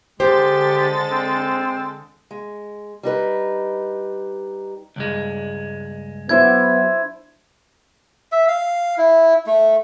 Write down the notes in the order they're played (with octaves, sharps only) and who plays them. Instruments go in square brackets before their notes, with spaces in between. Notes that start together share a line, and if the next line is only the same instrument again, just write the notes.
[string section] D3 A4 A6 [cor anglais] G#3 [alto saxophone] G4 [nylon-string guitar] C5
[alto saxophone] C4
[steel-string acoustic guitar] G#3
G3 D#4 B4
[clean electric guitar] C#2 G2 G#3
[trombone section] F#3 B3 [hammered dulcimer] D4 E4 C5 [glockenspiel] G#6
[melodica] E5
F5
E4
A3